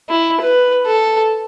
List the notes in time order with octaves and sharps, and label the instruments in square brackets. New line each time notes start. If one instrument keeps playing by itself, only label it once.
[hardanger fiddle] E4
B4
A4